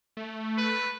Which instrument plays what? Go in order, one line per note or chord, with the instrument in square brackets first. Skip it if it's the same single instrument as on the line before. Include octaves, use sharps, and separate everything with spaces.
[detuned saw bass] A3
[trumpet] B4